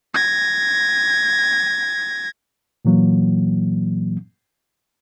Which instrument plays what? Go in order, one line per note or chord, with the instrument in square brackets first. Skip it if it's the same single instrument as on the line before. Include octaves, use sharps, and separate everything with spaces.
[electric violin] G#6 A#6
[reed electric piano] A#2 E3 F#3 A#3